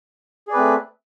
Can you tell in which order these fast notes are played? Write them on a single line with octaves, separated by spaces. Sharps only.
G#4 D5 B4 C4 A3